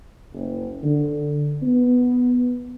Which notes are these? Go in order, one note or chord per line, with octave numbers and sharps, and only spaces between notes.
F#1
D3
B3